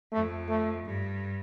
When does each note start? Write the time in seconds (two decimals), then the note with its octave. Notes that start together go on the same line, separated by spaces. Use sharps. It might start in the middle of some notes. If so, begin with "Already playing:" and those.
0.12 F2 A3
0.49 A3
0.85 G2